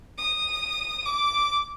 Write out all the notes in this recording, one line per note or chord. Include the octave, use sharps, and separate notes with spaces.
D#6
D6